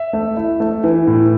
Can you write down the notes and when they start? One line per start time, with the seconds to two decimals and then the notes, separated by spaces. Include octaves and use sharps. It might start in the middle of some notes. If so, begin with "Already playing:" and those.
Already playing: E5
0.13 A3
0.37 E4
0.60 A3
0.84 E3
1.07 A2